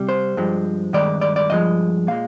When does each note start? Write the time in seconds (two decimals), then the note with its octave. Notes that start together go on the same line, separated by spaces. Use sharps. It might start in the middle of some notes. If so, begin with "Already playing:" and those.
Already playing: C3 G3
0.09 C5
0.37 G2 F3 G#3
0.93 G2 D#3 G#3 D5
1.21 D5
1.36 D5
1.50 G2 F3 G#3 D#5
2.07 A#2 G#3 F5